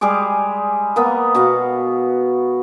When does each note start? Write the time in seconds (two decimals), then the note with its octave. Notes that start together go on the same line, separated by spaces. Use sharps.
0.01 G3 G#3 G#4 D6
0.96 A#3 B3
1.35 B2 F#4 F5